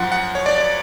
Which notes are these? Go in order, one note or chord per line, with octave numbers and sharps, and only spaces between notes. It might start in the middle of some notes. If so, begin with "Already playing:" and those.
Already playing: F#2 F3 F#5
F#5
C#5
D5
D5